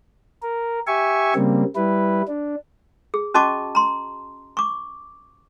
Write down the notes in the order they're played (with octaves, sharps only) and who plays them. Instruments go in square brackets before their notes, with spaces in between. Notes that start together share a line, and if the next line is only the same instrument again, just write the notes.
[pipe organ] A#4
G4 E5 G#5 C#6
C#3 G3 A#3 C4
G3 E4 B4
D4
[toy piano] G#4
C#4 F#4 D#5 A5 C#6 D6
A#5 C6
C#6 D6